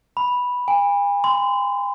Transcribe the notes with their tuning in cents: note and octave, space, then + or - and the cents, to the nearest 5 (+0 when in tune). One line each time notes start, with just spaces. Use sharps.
B5 -5
G#5 -45
C6 -30